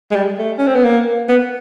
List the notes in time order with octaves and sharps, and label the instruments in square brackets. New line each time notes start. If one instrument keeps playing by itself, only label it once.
[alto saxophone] G#3
G3
A3
C#4
C4
B3
A#3
B3